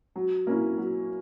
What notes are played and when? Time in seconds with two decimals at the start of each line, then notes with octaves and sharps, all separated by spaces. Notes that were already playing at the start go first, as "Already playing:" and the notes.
0.16 F#3
0.47 A#3 C#4 E4
0.78 F#3